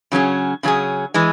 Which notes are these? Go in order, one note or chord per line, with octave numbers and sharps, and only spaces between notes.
C#3 F#3 C#4 G#4
C#3 F#3 C#4 G#4
E3 G#3